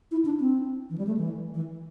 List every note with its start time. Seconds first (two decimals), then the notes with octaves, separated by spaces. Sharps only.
0.11 E4
0.25 D4
0.40 C4
0.90 E3
0.98 G3
1.07 A3
1.17 E3
1.54 E3